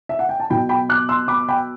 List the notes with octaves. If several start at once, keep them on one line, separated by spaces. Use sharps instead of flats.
E5
F#5
G5
A5
B2 F#3 G5 B5
G5 B5
D6 F#6
C6 E6
B5 D6
G5 B5